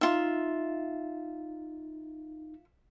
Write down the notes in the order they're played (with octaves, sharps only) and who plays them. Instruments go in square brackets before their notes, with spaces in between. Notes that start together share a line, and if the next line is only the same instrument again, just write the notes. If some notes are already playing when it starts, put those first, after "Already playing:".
[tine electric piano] D#4 [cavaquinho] F4 E5